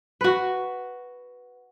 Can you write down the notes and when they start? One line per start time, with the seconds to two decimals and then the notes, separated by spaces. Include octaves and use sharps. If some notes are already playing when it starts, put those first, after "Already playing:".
0.21 F#4 B4